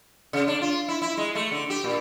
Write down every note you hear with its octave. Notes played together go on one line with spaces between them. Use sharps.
C#3
D4
F4
E4
E4
G#3
A3
D3
G4
A#2